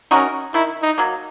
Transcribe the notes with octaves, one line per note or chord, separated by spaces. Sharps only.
C#4 D#4 F#4 A#4
D#3 E4
D#4
F#3 A#3